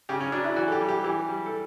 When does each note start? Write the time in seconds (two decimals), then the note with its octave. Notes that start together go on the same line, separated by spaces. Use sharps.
0.09 C#3 G4
0.20 C#4
0.32 F#3 D4
0.44 E4
0.56 E3 F#4
0.68 A4
0.72 G4
0.81 G3
0.88 G4
1.04 E3 G4
1.28 G3
1.46 A4